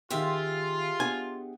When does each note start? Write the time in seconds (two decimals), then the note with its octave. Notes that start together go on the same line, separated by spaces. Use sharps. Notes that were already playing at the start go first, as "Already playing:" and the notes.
0.10 D#3 F4 G4 G#4 E5 C6
1.00 B3 D4 F#5 G#5